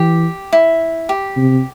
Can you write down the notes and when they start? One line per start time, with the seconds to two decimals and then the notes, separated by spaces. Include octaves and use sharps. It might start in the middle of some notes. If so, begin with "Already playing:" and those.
Already playing: E3 G4
0.53 E4
1.09 G4
1.37 C3